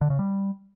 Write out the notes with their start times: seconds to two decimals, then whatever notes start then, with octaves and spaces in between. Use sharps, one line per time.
0.01 D3
0.10 C#3
0.19 G3